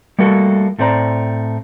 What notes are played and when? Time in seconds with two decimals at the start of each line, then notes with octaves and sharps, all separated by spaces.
0.19 G3 A3 A#3 F#4 A4
0.79 A2 A3 C4 C5 D5 A#5